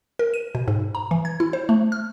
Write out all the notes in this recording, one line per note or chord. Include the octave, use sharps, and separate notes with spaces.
A#4
D#7
B2
G#2
A#5
E3
G#6
E4
C5
A3
F6